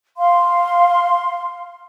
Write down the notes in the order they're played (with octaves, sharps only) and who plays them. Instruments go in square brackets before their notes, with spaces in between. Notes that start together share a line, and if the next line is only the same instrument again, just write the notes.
[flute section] F5 C6